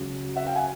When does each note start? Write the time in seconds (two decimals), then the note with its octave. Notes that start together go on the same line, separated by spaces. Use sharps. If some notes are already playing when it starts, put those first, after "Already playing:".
Already playing: C#2 C#3 F#3
0.36 E5 F#5
0.46 F5 G5
0.55 F#5 G#5